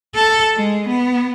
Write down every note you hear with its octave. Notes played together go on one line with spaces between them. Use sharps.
A4
G#3
B3